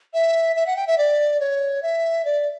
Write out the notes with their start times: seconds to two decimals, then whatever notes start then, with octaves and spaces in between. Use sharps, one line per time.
0.14 E5
0.56 E5
0.66 F#5
0.76 G5
0.87 E5
0.98 D5
1.40 C#5
1.82 E5
2.25 D5